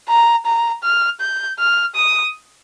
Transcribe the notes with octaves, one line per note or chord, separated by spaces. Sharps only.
A#5
A#5
F6
G6
F6
D#6